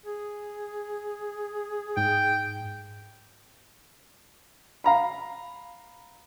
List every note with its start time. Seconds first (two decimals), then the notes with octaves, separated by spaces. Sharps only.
0.06 G#4
1.97 G#2 G5
4.84 F5 A#5 B5